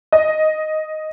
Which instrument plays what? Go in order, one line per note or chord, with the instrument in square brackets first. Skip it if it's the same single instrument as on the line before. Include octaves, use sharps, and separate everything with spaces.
[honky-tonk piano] D#5